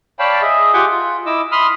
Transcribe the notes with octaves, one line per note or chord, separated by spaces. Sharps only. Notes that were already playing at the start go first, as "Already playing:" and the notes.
C#5 D5 F5 G5 A5 B5
G#4 D#5 E5
F4 G4 F#5 G#5 D6 G6
F4
E4 D#5 D6 E6
B5 C6 D#6 F6